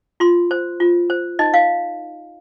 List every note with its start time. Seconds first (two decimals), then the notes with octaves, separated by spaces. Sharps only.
0.20 F4 C6
0.51 C5
0.80 F4
1.10 C5
1.39 D#4 D#5
1.54 F5